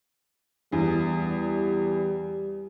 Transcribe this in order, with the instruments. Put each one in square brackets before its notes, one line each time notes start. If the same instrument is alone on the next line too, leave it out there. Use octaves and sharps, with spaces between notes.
[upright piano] E2 [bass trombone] G3